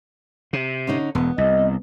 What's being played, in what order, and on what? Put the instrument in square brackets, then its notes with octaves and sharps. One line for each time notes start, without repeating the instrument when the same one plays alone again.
[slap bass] C3
[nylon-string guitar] D3 C#4 D#4
[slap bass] E1 [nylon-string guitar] B3
[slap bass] C2 [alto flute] D#5